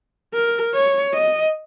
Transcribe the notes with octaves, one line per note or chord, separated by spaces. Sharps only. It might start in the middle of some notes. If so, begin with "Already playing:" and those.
A#4
C#5
D#5